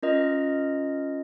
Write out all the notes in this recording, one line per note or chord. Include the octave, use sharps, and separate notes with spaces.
C#4 F4 A#4 D#5